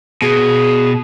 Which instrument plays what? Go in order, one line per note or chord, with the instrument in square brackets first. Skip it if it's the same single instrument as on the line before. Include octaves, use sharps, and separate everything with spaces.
[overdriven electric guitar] B2 [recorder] G#4